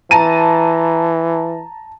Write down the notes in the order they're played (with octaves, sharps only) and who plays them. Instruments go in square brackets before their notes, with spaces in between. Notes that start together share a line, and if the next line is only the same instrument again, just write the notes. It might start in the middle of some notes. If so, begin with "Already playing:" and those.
[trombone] E3 [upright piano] A5 A#5 D#7